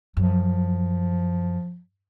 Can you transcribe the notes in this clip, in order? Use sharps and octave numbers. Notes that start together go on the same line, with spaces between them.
F#2 F3